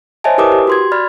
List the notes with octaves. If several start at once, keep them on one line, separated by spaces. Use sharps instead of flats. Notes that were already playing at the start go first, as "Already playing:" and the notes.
C5 C#5 D#5 E5 G#5 A5
E4 G4 A#4 B4 D6 D#6
G4
F#4 C6 G#6
D5 B5 F6 A6